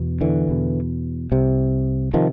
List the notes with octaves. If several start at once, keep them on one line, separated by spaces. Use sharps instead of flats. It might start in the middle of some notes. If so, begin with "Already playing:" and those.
Already playing: E2 B2
D3 E3
E2 B2
C2 C3
C3 D#3 F3